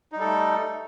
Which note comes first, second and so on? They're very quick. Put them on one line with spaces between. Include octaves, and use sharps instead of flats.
D#4 G3 A4 A3